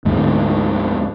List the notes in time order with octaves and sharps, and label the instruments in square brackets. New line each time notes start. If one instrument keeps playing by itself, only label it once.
[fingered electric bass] D2 G#2 D3